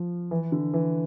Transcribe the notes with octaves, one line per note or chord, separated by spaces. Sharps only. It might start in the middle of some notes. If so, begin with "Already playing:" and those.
Already playing: F3
E3
D3
E3